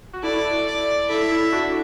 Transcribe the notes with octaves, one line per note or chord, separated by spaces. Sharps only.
F#4
E4 A4 D5
D5
E4 A4 E5
E4 A4
D4 F#4